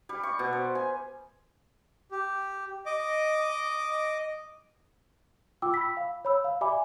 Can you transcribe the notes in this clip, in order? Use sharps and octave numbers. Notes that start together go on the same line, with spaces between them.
G3
C#6
B2
C5
G#5
G4
D#5 D6
F4 G5 D6 E6
B5 E6 B6
F5
C#5 B5 E6
F5
G4 D5 E5 G#5 B5 D6